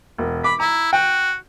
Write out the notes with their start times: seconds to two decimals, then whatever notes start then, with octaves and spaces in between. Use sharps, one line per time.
0.18 E1
0.44 B5 D6
0.60 E4 A#5
0.93 F#4 G5